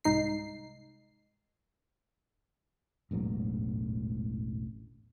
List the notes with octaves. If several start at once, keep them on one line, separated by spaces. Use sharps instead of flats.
C2 G#2 D#4 C7
E1 A1 G#2 F#3